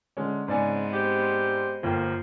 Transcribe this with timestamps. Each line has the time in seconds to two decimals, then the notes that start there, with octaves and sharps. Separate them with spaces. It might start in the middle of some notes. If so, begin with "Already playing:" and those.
0.17 D3 G#3 C#4
0.48 G#2 C#3 G#3 B3 C4 D5 G#5
0.93 G4 C5
1.83 G1 F3 A#3 G5